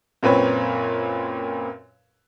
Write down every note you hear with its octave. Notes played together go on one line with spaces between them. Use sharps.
F#2 A#2 C4 B4 C#5